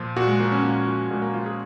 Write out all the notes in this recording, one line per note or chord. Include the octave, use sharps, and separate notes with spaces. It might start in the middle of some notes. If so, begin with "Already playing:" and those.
Already playing: A#2 F3 F4
A#2 F#4
G#3
F3 A#3
C#4
A#2 A#3
F3
A#2 G#3
A#3
F3 F4
G#4